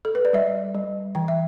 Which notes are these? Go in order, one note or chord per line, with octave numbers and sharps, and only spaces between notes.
A4
B4
D5
G3 E5
G3
E3 G5
E5